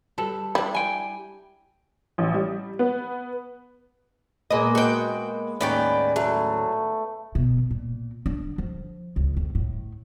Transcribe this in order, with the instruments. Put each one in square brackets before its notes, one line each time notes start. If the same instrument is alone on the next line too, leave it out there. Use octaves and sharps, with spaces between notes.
[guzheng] G3 [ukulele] A4 B4
[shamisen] G3 [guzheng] D4 E4
[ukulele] G5 G#5
[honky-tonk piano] A1
G3
B3
[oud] A#2 A#3 D#5 [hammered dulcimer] G#3 B3
[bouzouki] F#4 G5
[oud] D#2 A2 C#4 [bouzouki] B3 D5 G5 [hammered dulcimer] B4 C#6
[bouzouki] F#3 [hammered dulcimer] A3
[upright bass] B2
A#2
D4
F3
C#2
F2
A2